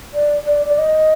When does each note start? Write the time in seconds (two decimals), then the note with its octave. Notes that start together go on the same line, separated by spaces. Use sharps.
0.14 D5
0.46 D5
0.66 D5
0.78 D#5